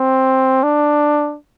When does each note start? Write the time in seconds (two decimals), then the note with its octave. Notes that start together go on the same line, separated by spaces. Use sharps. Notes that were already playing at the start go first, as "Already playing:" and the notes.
Already playing: C4
0.63 D4